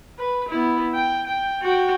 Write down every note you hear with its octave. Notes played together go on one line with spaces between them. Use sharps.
B4
B3 E4
G5
G5
F#4 G5